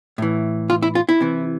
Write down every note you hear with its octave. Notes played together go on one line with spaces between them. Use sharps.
A2 E3
F4
E4
F4
E4
C3 E3